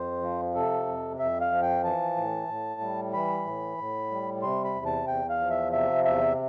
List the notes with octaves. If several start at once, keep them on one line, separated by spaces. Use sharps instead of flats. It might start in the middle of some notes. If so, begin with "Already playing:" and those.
Already playing: F2 C5
F3
C3 A4
F2
F2 E5
F5
F3
G5
E3 A5
A2
A2
G3
E3 B5
A2
A2
G3
C3 C6
B5
E2
A5
E2 G5
F5
F3
E5
C3 E5
E2 E5